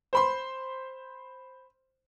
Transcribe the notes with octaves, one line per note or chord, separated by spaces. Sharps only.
C5 B5 C6